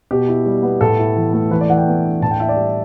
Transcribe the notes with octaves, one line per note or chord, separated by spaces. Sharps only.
B2 G4
E4
G3
B3
A2 A4
E4
E3
A3
E3 B4
D5
E3 F#5
G5
B3
D4
A2 A5
G5
E4 E5
D5
G3